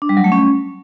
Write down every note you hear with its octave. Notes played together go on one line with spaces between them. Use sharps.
D4
G3
F#3
A3
C#4